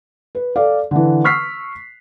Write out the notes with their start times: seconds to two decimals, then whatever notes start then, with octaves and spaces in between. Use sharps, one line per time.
0.35 B4
0.56 A4 D5 F5
0.91 D3 E3
1.24 C#6 E6 F6 B6 C7